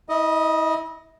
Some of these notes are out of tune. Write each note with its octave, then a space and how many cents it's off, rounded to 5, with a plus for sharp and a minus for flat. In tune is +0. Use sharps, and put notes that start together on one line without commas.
E4 -35 D#5 +0